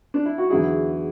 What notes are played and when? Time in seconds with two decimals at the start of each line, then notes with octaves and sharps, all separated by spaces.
0.14 D4
0.26 E4
0.38 F#4
0.50 E2 D3 F#3 E4 G#4